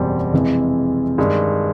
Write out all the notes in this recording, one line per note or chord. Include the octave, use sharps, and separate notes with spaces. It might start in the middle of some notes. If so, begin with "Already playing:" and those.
Already playing: F#1 E2 B2 G3 C4
F2 C3 E3 G#3
G2 D#3 G#3